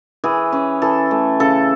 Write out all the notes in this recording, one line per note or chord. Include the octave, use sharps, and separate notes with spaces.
E3 G#4
C#4
E3 A4
A3
C#3 A4